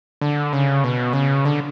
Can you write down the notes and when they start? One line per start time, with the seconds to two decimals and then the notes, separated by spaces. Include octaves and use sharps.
0.21 D3
0.53 C#3
0.84 B2
1.13 C#3
1.45 D3